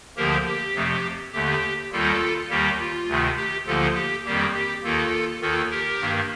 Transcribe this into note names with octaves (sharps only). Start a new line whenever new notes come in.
D2 D3 F3 A#3 G4 A#4
G4
F2 C3 F3 A3
D#2 D3 A3 G4
D#2 D#3 G3 A#3 F4 A4
D#2 D#3 G3 A#3 G4
F4
D2 C3 D#3 A3
G4
D2 D3 F3 A#3 F4 A4
G4
F2 D#3 G3 A#3 G4
G4
D#2 D#3 A#3 F4 A4
D#2 D#3 A#3 F4 A4
G4 A#4
G2 D#3 A#3